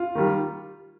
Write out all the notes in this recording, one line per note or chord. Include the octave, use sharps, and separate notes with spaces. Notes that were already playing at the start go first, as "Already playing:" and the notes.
Already playing: F4
D#3 G3